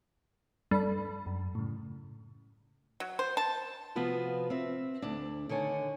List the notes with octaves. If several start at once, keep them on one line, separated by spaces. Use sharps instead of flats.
G2 A4 B5
F#2
A2 C#3
F#3
C5
A5
C3 F3 B3 F4 F#4 B4
C4 E5
D2 D4
D3 D#3 C#5 G#5